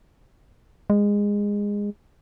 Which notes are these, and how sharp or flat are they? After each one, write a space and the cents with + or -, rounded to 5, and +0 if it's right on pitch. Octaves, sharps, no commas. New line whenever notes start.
G#3 -20